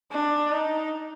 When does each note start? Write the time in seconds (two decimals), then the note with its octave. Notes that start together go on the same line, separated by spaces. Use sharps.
0.12 D4
0.51 D#4